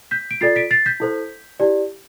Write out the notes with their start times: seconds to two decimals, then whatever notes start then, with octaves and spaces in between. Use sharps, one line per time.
0.11 G6 B6
0.31 D7
0.41 F4 A4 D5 A6 C7
0.56 B6 D7
0.71 A6 C7
0.86 G6 B6
1.00 E4 A4 C5
1.60 E4 G4 D5